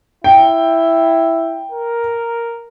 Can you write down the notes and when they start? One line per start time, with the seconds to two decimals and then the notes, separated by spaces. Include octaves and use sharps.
0.24 E4 G5
1.72 A#4